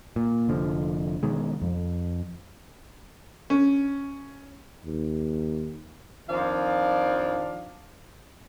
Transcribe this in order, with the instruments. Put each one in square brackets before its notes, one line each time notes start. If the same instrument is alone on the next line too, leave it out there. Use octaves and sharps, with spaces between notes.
[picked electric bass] A#2
F1 D3 F3
B2 D#3 G#3
F2
[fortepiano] C#4
[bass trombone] D#2
[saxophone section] F2 D#3 F3 D4 F5